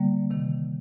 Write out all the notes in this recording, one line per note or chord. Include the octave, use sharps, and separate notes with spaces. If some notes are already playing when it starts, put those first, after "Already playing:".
Already playing: D3 G3 A#3
C3 D#3 A#3